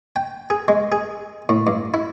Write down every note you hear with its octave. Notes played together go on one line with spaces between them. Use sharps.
G5
G#4
G#3
G#4
A2
G2
E4